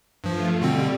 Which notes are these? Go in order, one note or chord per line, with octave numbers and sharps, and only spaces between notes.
G2 F3 A3 F4
B2 D3 G3 C4